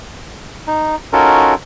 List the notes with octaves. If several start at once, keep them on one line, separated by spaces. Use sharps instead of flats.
D#4
C#4 D#4 F4 F#4 A4 A#4